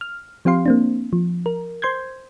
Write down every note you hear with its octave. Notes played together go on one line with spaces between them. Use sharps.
F6
F3 C4 G4 F5 C6
A#3 C4 D4
F3
A#4
C5 C6 G6 G#6